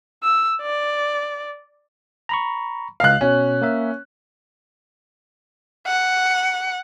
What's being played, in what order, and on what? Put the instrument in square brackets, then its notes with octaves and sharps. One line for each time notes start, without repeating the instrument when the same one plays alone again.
[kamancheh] E6
D5
[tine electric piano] A#5 B5 C#6
[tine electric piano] C#2 D#5 [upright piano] F5 F#6
[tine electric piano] B2 [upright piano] C#4
[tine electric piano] A#3 A#4 E5
[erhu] F#5